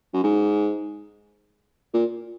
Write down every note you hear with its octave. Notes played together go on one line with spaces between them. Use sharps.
F#2
G#2
A#2